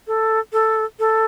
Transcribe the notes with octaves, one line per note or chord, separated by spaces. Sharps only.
A4
A4
A4